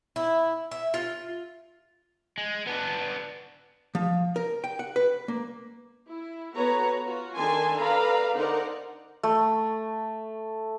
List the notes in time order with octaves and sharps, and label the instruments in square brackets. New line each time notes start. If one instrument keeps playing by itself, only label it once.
[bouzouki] E4
E5
F4
[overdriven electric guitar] G#3
B3 D4
[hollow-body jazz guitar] F3
A#4
G5
F#5
B4
A#3
[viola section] E4
B3 F#4 A4 B4 C#5 A#5
F4 F#4
D#3 D4 A4 G#5 A5 C6
A4 B4 D5 F5 A#5 B5
D3 D#4 A#4 C5 D5 F#5
[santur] A3